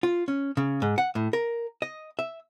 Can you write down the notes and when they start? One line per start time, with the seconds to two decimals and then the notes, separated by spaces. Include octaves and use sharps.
0.03 F4
0.28 C#4
0.57 C#3
0.82 G#2
0.98 F#5
1.15 A2
1.33 A#4
1.82 D#5
2.19 E5